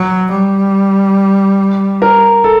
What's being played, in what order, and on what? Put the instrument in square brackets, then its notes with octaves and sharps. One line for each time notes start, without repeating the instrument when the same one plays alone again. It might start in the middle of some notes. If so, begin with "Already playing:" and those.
Already playing: [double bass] F#3
G3
[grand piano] A#4
A4